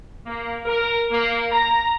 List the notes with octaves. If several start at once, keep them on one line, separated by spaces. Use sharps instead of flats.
A#3
A#4
A#3
A#5